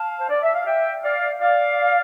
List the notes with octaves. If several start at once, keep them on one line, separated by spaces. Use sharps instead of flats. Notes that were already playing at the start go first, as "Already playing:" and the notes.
Already playing: F5 A5
C5
D5
E5
F5
E5 G5
D5 F5
D5 F5